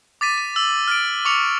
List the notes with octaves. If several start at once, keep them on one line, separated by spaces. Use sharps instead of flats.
D6 A6 B6 D#7
D#7
E6 F#7
F6 A6 D7
C#6 D6 C#7 F7